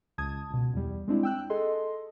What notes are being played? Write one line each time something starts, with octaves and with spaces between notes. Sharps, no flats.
C#2 A5 D#6 G#6
C#2 B2
E2 G3
G#3 C4 D4 E4
G5 E6 F#6
G#4 A4 D#5 C6